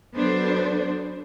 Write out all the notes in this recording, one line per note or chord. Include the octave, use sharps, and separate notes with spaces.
F#3 B3 D4 A4 C5